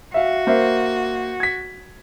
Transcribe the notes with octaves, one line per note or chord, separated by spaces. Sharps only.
F#4 E5 F5
A#3 C5 E5
G#6 B6